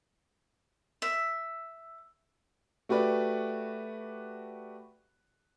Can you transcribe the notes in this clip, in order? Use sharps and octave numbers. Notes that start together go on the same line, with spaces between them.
E5
A3 F#4 G4 B4 D5